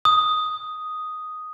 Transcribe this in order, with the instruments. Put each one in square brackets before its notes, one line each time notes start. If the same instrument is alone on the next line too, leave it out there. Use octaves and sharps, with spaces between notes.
[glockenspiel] D#6